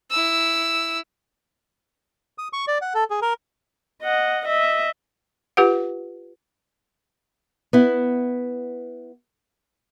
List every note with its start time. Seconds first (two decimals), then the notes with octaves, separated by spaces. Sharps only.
0.10 E4 E6
2.38 D#6
2.53 C#6
2.68 D5
2.81 F#5
2.94 A4
3.10 G#4
3.22 A#4
4.03 D#5 F#5
4.46 D#5 E5
5.57 F4 G4 B4 F#5
7.73 B3 E4